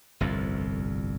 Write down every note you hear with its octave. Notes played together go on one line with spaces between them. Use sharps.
G1 C2 F2